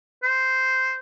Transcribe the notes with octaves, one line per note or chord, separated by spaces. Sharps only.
C5